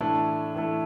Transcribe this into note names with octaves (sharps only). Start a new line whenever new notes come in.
A2 E3 A3 D4
A2 E3 A3